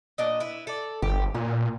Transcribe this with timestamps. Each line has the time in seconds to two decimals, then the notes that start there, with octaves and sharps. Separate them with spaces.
0.18 A#2 D4 D#5
0.40 E4 B4
0.67 A4 D5
1.02 G1 G4
1.35 A#2 C#4